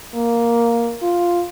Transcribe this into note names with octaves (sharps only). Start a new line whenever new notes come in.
A#3
F4